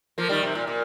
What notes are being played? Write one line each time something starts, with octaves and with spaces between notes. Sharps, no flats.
F3 A#3
D#3 G3
C3
A#2
A#2